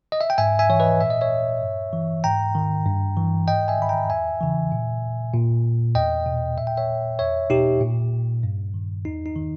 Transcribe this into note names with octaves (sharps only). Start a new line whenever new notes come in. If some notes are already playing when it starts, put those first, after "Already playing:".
D#5
E5
G5
G#2 E5 G#5
E5 G#5
E3 C#5
B4 D#5
A#2 E5
D#5
C#5 E5
G2
E3
G#2 G5 A#5
D#3
G2
E3
G#2 D#5 G5
E5 G#5
D#3 B5
G5 A#5
E2 E5 G#5
C#3 E3
A#2
A#2
E2 D#5 G5
B2
A#2 E5
G5
C#5 E5
E2 C#5 E5
B2 D#4 G4
A#2
G2
D#3
E2 D#4
D#4
D#3